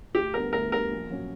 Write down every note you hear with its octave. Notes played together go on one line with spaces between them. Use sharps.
D2 G4
D3 G3 B3 A#4
D2 A#4
D3 G3 B3 A#4
A#1
A#2 F#3 C#4